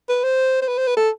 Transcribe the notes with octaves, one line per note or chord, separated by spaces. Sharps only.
B4
C5
C5
B4
C5
B4
A4